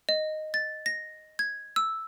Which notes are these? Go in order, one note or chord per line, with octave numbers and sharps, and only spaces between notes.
D#5
A6
A#6
G#6
E6